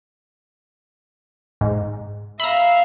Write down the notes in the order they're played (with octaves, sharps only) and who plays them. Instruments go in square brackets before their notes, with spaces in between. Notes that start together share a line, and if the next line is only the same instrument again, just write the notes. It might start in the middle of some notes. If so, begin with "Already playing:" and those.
[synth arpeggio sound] G#2
[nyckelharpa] E5 F5 [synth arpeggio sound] A#5 B5